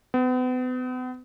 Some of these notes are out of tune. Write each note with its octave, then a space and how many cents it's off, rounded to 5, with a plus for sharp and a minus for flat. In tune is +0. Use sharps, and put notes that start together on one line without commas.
B3 +40